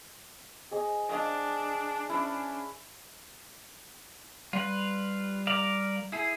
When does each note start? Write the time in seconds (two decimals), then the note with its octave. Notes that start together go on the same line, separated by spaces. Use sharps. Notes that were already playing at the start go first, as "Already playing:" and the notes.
0.71 G#4 D#5 D#6
1.09 D4 D#5 F5
2.09 C#4 D4 E4
4.53 G3 F4 B4
5.47 A#4 D5 F5
6.12 E4 G#4